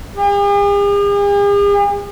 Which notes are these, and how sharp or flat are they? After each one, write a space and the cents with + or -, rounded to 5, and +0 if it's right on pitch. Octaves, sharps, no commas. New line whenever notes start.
G#4 -45